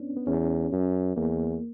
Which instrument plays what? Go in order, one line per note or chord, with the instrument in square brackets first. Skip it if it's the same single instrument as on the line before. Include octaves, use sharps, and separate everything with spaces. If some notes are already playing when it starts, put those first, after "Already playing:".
Already playing: [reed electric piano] B3 C#4 D4
B3
[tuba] E2 [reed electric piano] C#4
[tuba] F#2
[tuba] E2 [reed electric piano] A#3